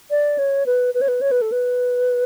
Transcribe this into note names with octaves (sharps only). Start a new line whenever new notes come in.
D5
C#5
B4
B4
C#5
B4
C#5
B4
A4
B4